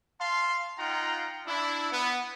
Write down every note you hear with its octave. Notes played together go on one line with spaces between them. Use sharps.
F5 A5 C6
D#4 F4 F#5 G5 A#5
D4 E4
B3